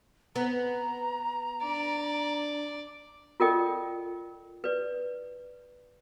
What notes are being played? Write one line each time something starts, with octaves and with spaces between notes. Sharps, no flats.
B3 A#5
D4 D5
F4 A4 A#4 D5 D#5 G5
B4 D5